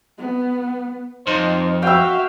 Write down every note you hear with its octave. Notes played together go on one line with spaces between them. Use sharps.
B3
F2 D#4 C5
F#4 E5 F5 G5 E6